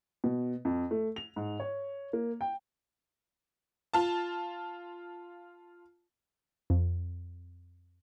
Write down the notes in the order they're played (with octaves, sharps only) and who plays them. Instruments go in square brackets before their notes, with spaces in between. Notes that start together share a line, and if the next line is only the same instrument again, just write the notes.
[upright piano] B2
F2
A3
F7
G#2
C#5
A#3
G5
[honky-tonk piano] F4 A5
[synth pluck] F2